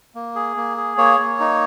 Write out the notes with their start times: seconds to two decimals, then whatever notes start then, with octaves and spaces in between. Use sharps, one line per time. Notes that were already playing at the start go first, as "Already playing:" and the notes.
0.15 A#3
0.35 G#4
0.57 A#3
0.77 G#4
0.98 A#3 C#5
1.19 A#3
1.40 D#4